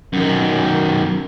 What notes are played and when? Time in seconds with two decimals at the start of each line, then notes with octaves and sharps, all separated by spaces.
0.13 F#2 D#3